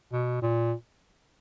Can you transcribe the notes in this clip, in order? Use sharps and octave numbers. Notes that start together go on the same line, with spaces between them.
B2
A#2